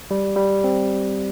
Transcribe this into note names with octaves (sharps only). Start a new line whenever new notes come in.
G3
G3
C4